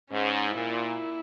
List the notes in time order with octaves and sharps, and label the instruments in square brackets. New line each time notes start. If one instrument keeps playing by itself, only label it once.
[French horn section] G#2 [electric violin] C#4
[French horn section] A#2 [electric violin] E4